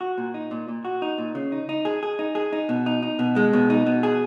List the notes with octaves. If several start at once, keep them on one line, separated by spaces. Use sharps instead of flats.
F#4
A#2
D#4
A#2
A#2
F#4
D#4
A#2
C#3
D#4
D#4
G#4
G#4
D#4
G#4
D#4
B2
D#4
D#4
B2
G#3
B2
D#4
B2
G#4